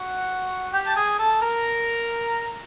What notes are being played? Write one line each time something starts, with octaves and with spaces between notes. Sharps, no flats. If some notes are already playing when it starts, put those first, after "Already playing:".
Already playing: F#4 F#5
G4 G5
A5
G#4 G#5
A4 A5
A#4 A#5